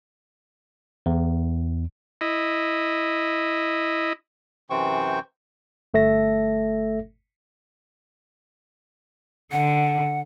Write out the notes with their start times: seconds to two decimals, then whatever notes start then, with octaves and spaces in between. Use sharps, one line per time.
1.06 E2
2.21 E4 D#5
4.70 F#2 C3 E3 C5 G5 C#6
5.94 G1 A3 A4 E5 A#6
9.52 D3 F#5